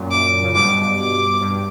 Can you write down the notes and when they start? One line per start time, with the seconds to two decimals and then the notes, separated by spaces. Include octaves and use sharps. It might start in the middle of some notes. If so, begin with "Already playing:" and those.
Already playing: F#2 A#2
0.11 D6
0.43 C#3
0.54 G2 B2 D6
0.97 D6
1.41 G2